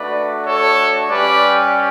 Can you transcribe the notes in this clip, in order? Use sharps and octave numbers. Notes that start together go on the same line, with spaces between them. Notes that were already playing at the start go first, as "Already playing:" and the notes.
Already playing: A3 D4 F#4 B4 D5
A4 C#5
G3 C#4 G4 B4 D5